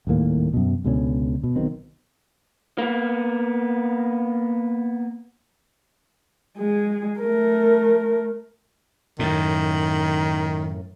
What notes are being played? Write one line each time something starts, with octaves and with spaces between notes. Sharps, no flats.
D#1 D#2 A2 A#3
F#2 B2
C#2 B2 D3 C#4
B2
B1 B2 D#3 C4
A#3 B3
G#3 G#4
A3 A#4
F#2 A2 D#3